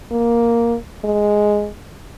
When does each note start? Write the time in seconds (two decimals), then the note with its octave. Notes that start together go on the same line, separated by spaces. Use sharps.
0.11 A#3
1.04 G#3